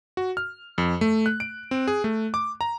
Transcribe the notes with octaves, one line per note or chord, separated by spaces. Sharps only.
F#4
F6
F2
A3
F#6
D7
C4
G#4
A3
D6
A#5